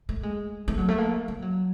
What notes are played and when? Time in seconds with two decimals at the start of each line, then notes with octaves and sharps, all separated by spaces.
0.09 A3
0.23 G#3
0.68 A3
0.77 F#3
0.88 A3
0.98 A#3
1.28 G3
1.42 F#3